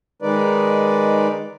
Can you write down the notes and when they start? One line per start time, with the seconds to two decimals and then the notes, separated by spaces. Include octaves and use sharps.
0.22 D#3 G#3 D#4 B4 D5